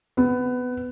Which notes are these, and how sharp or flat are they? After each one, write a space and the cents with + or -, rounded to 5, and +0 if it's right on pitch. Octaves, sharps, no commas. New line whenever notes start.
B3 +15